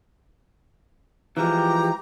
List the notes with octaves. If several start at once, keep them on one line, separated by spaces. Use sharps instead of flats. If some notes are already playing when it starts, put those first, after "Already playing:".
E3 F3 G#3 G4 A#5